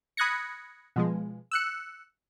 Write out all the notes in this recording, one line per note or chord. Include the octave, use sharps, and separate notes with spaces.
B5 D#6 F#6 G#6 A#6 C#7
B2 F3 G#3
E6 F#6 C#7